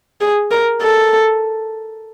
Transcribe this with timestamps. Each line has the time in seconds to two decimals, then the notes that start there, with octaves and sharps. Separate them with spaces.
0.21 G#4
0.51 A#4
0.82 A4